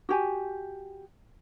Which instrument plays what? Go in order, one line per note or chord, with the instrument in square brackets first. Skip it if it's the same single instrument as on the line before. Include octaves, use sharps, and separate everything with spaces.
[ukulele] F#4 G4 G#5